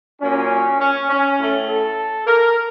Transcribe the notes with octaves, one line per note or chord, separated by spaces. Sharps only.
A#2 F#3 A#3 C#4
C#4
C#4
A2 A3
A4
A#4